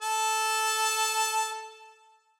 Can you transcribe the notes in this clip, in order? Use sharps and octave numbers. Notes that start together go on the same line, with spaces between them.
A4 A5